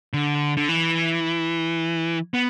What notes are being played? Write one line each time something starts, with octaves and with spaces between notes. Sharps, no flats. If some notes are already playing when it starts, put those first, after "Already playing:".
D3
D3
E3
B3